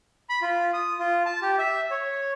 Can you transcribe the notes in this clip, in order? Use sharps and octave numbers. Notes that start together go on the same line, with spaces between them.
B5
F4
D#6
F4
A5
G4
E5
C#5